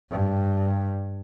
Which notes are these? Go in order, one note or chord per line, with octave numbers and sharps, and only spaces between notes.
G2